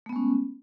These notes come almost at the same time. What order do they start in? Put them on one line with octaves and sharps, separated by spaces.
A3 B3 G#3 C#4